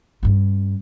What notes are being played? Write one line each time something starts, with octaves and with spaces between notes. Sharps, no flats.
G2 C#4